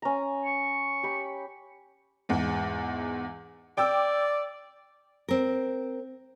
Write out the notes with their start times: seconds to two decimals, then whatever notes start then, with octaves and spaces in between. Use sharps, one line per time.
0.02 C#4 A#5
0.45 C#6
1.03 G4 B5
2.29 E2 G#2
3.77 D5 G5 D6 E6
5.29 C4 A#4